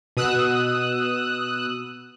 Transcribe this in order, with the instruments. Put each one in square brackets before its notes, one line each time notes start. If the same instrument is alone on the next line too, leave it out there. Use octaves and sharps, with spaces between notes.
[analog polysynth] B2 D#6 E6 F#6